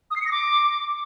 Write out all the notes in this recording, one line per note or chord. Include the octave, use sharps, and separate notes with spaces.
D#6
C7
C#7
A#6
D6